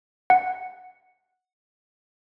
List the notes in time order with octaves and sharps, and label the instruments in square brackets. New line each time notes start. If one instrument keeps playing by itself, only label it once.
[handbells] F#5